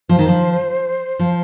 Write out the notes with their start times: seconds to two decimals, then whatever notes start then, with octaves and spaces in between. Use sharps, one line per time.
0.09 F3 C5
0.19 D#3
0.27 F3
1.19 F3